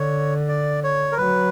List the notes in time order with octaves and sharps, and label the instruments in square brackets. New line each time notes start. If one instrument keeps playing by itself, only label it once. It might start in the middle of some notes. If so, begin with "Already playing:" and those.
Already playing: [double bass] D3 [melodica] C#5
[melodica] D5
C#5
A#4
[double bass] F#3 [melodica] B4